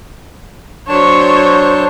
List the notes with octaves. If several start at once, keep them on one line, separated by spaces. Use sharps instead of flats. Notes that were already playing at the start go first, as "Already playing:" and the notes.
F#3 D4 C5 C#5 A5